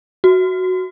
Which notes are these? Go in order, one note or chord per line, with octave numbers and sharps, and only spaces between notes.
F#4